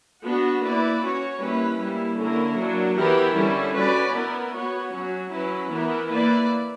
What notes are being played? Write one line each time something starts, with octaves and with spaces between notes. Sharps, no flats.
B3 D4 F#4
A#3 E4 B4 D5
C#4 F#4 C#5
G3 A#3 C#4 E4 B4
G3 A#3 E4
D3 A#3 C#4 E4 A#4
F#3 A#3 D4
E3 B3 E4 G4 A#4
D3 G3 C#4 E4
C#4 F#4 B4 D5
B3 E4 A#4
B3 F#4 C#5
F#3 C#4 F#4
F#3 C#4 E4 B4
E3 B3 E4 A#4
A#3 E4 B4 D5